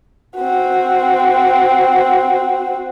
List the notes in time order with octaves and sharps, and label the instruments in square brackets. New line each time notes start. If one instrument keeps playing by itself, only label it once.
[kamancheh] C4 F#4